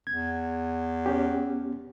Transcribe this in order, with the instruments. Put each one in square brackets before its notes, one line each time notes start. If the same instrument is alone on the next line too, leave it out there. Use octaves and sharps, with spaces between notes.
[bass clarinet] E2 [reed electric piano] G#6
[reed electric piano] B3 C#4 G4